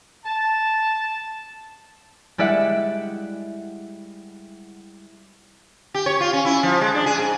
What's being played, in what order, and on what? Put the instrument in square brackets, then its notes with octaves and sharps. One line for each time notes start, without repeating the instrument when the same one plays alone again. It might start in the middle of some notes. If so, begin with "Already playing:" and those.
[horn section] A5
[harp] G3 G#3 E4 D5 E5 F#5
[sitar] G4
C#5
F4
C#4
E4
F3
G#3
D4
G#4
G#2